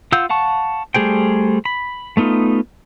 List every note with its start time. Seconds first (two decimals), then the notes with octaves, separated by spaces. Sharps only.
0.12 F4 F5 F#5 E6 G6
0.30 F5 F#5 A5 C#6
0.94 G3 A3 G#4 C5 G5
1.65 B5
2.17 A3 B3 D#4 F4